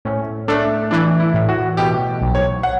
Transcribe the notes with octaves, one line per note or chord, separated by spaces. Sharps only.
A2 C#4
A3 D4
E3 D4
E4
A2
F#4
B2 G4
B1
C#5
F#5